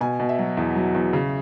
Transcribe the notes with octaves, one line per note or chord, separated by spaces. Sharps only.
B2 G#5
B2
E5
F#3
E2
F#3
E2
C#3